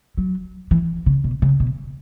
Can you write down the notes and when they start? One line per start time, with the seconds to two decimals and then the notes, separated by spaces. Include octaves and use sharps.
0.17 F#3
0.71 E3
1.06 C#3
1.24 B2
1.42 C#3
1.60 B2